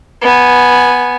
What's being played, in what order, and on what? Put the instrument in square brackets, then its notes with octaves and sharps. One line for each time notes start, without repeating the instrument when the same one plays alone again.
[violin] B3 G#5